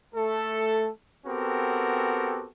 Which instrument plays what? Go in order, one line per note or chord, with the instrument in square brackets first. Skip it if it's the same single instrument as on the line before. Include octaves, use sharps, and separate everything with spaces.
[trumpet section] A3 A4
B3 C4 F#4 G4 A4 A#4